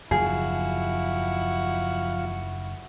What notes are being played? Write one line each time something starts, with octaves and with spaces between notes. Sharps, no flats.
F#1 D#2 F3 E4 F#4 G#4 F5